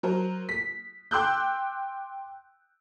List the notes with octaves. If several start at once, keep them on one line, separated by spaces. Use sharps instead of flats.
F#3 A#4 C5
B6
G5 C6 D6 E6 F#6 G6